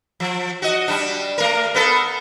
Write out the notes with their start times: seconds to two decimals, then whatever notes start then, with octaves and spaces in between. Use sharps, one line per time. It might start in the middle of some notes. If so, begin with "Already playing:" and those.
0.20 F3
0.62 F#4 D#5
0.88 G3 D4
1.38 A3 A#4
1.75 B3 A4 A#4